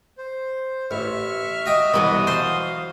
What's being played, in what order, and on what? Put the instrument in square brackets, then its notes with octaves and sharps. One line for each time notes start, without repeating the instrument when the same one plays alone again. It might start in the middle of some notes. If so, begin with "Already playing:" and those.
[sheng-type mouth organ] C5
[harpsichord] A1 [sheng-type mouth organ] E5 C#6 F6
[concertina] F#4 D#6 [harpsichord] D#5 G5
[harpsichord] C2 [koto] B2 E3 F#3
[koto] C5 [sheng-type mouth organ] F5 [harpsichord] A5